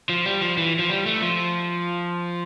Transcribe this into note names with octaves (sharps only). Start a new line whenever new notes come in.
F3
G3
F3
E3
F3
G3
A3
F3